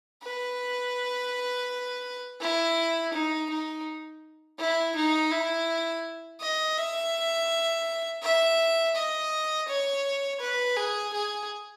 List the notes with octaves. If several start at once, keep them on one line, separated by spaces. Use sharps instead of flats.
B4
E4
D#4
D#4
E4
D#4
E4
D#5
E5
E5
D#5
C#5
B4
G#4
G#4